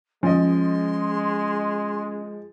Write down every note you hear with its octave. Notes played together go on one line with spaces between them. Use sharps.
F3 G#3 C#4 D#5 C6